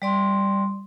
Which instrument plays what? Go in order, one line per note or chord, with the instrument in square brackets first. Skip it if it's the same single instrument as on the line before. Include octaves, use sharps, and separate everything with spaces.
[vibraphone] G3 D5 C6